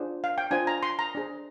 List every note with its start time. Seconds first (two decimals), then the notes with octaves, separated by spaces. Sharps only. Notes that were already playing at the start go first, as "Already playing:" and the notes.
Already playing: D4 F4 G#4 C5
0.24 F5
0.38 G5
0.51 D4 F4 C5 G#5
0.67 A#5
0.83 C6
0.99 A#5
1.15 D4 G#4 C5